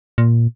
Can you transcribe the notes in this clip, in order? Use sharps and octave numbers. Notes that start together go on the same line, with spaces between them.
A#2